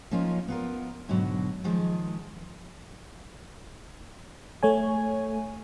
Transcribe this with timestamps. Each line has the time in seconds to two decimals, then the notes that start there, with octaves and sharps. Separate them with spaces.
0.11 F3 A#3 C#4 D#4 F4
0.48 B3 F4 A#4
1.09 G#2 B2 D3 F#3
1.64 D#3 F3 G#3
4.63 A3 C#5 G#5